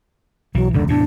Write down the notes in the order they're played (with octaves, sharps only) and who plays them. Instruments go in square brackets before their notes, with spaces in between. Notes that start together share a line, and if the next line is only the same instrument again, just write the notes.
[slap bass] B1 E3 [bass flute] F#3
[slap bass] E1 C#2 F#2 [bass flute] D3
[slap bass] E2 A2 C3 [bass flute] D4